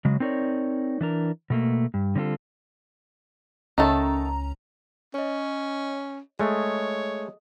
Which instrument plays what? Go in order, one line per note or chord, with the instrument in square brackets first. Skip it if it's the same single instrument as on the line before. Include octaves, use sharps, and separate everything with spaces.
[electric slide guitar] C#3 F#3 G#3
C4 D#4 A#4 C#5 D5
E3 D4 A#4
B2 A3 A#3
G2
D3 G3 C4 D4 F4 A4
[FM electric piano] C#2 C#4 A#5 [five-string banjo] D#3 A3 A4
[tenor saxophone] C#4 [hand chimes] C#5 D#5
[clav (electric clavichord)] G#3 A3 [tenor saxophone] C#5 [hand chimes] D#5 D#6